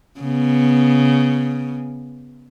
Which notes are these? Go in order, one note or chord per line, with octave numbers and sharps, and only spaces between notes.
C#3 B3